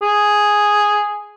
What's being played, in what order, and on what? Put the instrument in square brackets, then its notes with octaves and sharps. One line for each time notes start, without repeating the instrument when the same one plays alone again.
[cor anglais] G#4